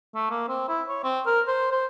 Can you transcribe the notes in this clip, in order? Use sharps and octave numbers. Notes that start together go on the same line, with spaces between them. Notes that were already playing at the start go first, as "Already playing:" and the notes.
A3
A#3
C4
E4
C#5
C4
A#4
C5
C5